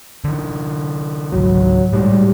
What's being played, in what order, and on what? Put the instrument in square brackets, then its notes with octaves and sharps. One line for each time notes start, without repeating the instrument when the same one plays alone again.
[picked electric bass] D3 E3
[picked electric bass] G#1 C#2 [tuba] F#3
[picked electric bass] A2 G#3 [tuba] G3